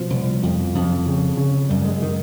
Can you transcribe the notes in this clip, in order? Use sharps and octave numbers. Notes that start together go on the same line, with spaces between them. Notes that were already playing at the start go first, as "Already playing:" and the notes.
Already playing: B2 F3
C2
F2
F2
C#3
C#3
F#2 G3
G#3
D#3